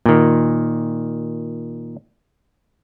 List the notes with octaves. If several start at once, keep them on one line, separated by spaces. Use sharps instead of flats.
A#2 D#3